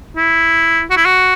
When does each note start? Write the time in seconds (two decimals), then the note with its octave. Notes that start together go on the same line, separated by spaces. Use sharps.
0.16 E4
0.90 F#4
0.97 E4
1.05 F#4